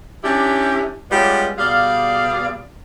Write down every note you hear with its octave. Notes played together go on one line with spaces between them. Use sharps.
C#4 D4 E4 G4
G3 G#3 B3 C#4 F4 D5
B2 G3 G#4 D5 F5